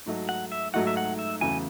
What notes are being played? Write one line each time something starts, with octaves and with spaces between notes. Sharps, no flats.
G#2 F#3 A3 D#4 F#4
F#5
E5
G#2 F#3 A3 D#4 F#4 F#5
E5
F#5
E5
E2 C#3 F#3 A3 G#5